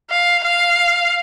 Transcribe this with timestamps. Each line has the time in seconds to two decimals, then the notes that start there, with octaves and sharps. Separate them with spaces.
0.10 F5
0.44 F5